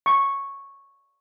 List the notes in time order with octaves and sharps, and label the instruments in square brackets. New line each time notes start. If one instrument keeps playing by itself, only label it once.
[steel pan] C#6